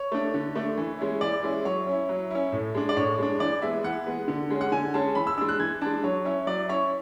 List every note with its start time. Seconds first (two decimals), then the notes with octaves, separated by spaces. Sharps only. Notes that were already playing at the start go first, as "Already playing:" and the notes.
Already playing: C#5
0.12 A3 D4
0.34 D3
0.55 A3 D4
0.78 E3
0.99 G#3 C#4 E4
1.21 E3 D5
1.43 G#3 C#4 E4
1.65 F#3 C#5
1.87 C#4 E4
2.09 F#3
2.31 C#4 E4
2.52 A2
2.75 G#3 D4
2.89 D5
2.97 A2 C#5
3.18 G#3 D4
3.40 E3 D5
3.62 G#3 B3 E5
3.84 E3 F#5
4.06 G#3 B3
4.28 D3
4.50 G#3 C#4
4.61 F#5
4.72 D3 G#5
4.94 G#3 C#4 A5
5.15 E3 B5
5.27 E6
5.38 G#3 D4 E6
5.49 F#6
5.59 E3 G#6
5.81 G#3 D4 A5
6.04 F#3 C#5
6.25 C#4 E4 C#5
6.47 F#3 D5
6.69 C#4 E4 C#5